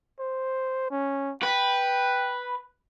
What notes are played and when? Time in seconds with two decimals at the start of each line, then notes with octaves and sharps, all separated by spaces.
0.20 C5
0.91 C#4
1.43 B4 G5